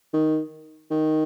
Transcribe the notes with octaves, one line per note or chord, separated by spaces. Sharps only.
D#3
D#3